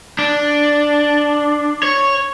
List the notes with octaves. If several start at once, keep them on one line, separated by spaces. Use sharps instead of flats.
D4
C#5